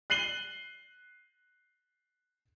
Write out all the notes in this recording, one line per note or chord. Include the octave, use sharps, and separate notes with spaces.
F#6 C7 D#7 F#7 G7